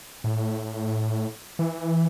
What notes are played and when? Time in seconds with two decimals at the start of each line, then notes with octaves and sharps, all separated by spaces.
0.24 A2
1.59 E3